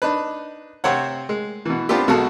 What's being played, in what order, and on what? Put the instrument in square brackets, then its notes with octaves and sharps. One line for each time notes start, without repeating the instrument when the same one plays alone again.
[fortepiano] D4 D#4 B4
C3 C4 C5 C#5 F#5
G#3
B2 E3
B3 C4 D4 F4 G4
B1 B2 G#3 F#4 A4 A5